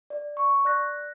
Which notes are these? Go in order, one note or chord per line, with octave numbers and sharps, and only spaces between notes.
D5
C#6
D5 F#6 A#6